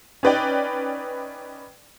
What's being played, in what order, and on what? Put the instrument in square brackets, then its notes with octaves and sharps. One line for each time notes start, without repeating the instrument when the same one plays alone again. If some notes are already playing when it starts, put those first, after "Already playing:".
[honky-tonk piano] C#4 D#4 B4 D5 G5